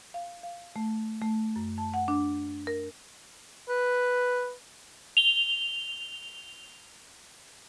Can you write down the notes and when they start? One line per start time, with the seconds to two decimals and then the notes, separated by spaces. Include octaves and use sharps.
0.14 F5
0.43 F5
0.76 A3
1.22 A3
1.56 F#2
1.78 A5
1.94 F#5
2.08 D4
2.67 A#4
3.69 B4
5.17 F7 G7